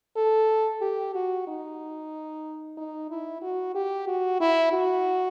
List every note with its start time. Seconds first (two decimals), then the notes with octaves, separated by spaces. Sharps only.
0.16 A4
0.81 G4
1.15 F#4
1.47 D#4
2.77 D#4
3.11 E4
3.42 F#4
3.75 G4
4.07 F#4
4.40 E4
4.73 F#4